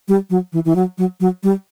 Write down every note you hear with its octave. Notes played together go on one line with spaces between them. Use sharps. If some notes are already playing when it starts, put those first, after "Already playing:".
G3
F#3
E3
E3
F#3
F#3
F#3
G3